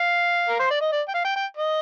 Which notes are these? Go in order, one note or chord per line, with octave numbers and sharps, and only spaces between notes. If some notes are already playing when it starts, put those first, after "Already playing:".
Already playing: F5
A#4
C5
D5
D#5
D5
G5
F5
G5
G5
D#5